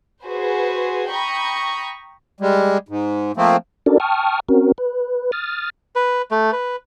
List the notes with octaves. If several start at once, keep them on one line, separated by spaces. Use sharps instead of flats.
F#4 G#4 B4 C5
G5 A#5 B5 C#6 D#6
G3 G#3
G#2
F3 A3 A#3 C4
C#4 D4 F#4 A4 A#4 D5
G5 A5 C#6 D#6 F6
C4 C#4 F#4 A#4
B4
D#6 F6 A6
B4
A3
B4